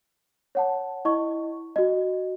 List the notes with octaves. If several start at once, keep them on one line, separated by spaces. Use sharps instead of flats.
C#5 F#5 A5
E4 D#5 C#6
F#4 D#5